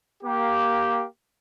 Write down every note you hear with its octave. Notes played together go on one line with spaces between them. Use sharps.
A#3 G4